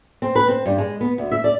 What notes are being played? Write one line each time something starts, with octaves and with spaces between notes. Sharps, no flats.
C4
B4
C4
G2
G#3
B3
D2
E5
D5